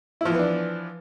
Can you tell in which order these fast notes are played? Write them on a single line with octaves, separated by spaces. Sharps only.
E4 F3 E3 B3 D4